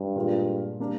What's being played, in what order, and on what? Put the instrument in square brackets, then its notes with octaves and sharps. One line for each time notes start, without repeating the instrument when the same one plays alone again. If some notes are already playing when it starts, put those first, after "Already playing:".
Already playing: [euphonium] G2
[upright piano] A#2 G#3 D4 F4 A#4
G3 A#3 D4